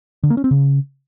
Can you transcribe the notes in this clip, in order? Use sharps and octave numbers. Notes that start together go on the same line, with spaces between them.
D3
A#3
C#4
C4
C#3